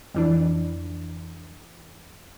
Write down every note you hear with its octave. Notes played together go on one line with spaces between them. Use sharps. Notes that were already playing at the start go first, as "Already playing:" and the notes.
F2 E3 D4